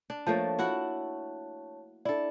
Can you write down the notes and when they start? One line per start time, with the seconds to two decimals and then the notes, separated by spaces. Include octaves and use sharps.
0.10 D4
0.27 F3 A3 A#3 C#5 A5
0.59 E4 F#4 F#5
2.05 D4 E4 A4 D5